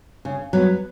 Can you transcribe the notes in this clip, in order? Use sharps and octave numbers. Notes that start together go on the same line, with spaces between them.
C#3
F#3 B3